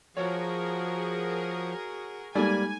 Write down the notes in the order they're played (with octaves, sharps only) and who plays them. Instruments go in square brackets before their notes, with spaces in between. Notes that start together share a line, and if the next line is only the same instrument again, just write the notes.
[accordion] F3 [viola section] F#4 G#4 A#4 [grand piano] C#5
[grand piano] G3 A#3 [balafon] G#3 D#4 A4 [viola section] G#5